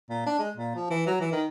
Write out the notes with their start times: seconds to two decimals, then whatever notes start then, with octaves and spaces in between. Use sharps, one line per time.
0.09 A#2
0.26 D4
0.39 G#3
0.57 A#2
0.75 F3
0.90 E3
1.06 F#3
1.20 E3
1.32 D#3